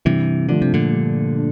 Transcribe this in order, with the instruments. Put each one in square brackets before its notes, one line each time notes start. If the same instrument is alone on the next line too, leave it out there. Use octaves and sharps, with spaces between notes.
[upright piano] G2 [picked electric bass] C3 E3
[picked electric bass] D3 [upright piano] F3 A3 D4
[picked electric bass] C3
A#2 D3
[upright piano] G2
D4